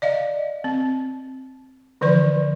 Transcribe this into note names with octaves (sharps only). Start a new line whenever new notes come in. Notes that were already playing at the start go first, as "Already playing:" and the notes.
D5 D#5 F5
C4
D3 E3 F3 B4 D5